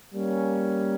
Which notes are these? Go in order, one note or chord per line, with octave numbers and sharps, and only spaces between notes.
G3 A#3 C#4